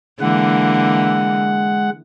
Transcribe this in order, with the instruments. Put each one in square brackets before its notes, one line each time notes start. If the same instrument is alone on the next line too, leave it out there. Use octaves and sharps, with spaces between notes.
[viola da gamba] D3 E3 A#3 [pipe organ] G#3 F#5